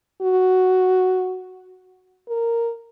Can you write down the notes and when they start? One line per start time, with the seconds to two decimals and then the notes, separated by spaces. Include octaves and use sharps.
0.22 F#4
2.28 A#4